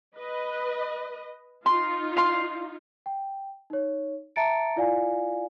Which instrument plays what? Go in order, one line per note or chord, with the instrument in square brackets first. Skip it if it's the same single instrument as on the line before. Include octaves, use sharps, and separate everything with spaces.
[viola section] B4 D#5
[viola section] D#4 F4 [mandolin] C6
[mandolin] F5 C6
[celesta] G5
D#4 C#5
E5 A5 A#5 A6 C#7 D7
E4 F4 D5 F5 G#5